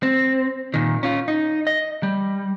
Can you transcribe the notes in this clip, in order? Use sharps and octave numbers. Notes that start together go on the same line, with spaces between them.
C4
A#2 D#3
C#4 F4
D#4
D#5
G3